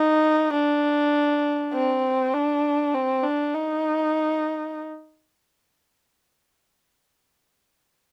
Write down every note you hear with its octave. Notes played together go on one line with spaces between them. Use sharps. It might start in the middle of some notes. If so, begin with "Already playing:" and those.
Already playing: D#4
D4
C4
D4
C4
D4
D#4